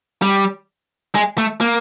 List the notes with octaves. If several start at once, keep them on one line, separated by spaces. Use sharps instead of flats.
G3
G#3
A3
A#3